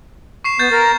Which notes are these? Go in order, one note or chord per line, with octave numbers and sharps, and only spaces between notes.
C#6 C7 E7
B3 G6 A6
A#4 A6